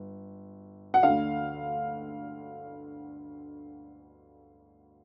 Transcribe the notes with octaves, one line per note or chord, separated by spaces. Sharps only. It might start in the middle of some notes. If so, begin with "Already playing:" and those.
Already playing: G1
F#5
D2 D3 F5